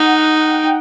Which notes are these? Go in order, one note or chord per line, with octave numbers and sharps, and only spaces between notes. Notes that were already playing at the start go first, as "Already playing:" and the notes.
Already playing: D#4 F#5
F#5
G5
F#5